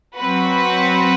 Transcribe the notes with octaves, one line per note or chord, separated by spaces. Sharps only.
F#3 C4 F#4 B4